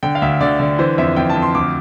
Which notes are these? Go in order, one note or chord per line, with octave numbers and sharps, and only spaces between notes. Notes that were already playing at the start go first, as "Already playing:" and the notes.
D3 G5
F5
D2 E5
D3 D5
D3
E3 C5
F2 E5
F2 G5
A5
F2
C6
D2 D6